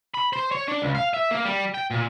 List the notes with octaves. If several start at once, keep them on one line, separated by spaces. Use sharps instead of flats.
B5
C5
C#5
D4
C#2
F5
E5
A#3
G3
G5
A#2